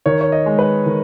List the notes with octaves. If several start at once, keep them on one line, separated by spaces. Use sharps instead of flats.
D#3 C#5
C#5
D#5
G#3
B4
D#3